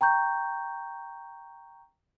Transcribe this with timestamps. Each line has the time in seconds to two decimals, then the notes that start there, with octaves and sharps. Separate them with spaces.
0.01 G5 A#5 C#6 G6